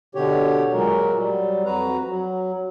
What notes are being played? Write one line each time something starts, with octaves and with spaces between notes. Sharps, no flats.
B2 D3 G4 C#5
A#2 F#3 G#3 F#4 A#4
F#3 G3
F2 F#4 B4 A#5
F#3